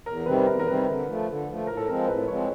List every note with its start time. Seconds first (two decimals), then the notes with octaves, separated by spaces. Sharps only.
0.06 E2 A#4
0.26 C3 D#3 G3 C4 B4
0.39 B4
0.46 E2 A#4
0.59 A#4
0.67 C3 D#3 G3 C4 B4
0.87 D3
1.07 F3 A3
1.27 D3
1.47 F3 A3
1.67 A2 A#4
1.77 A4
1.88 F3 G#3 C4 A#4
2.08 A2 B4
2.28 F3 G#3 C4 C#5